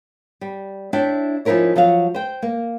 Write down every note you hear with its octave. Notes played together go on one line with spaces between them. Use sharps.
G3
D4 E4 C#5 E5 G5
F3 C#4 D#4 E4 A#4 C#5
F3 F#3 F#4 F5
C5 G5
A#3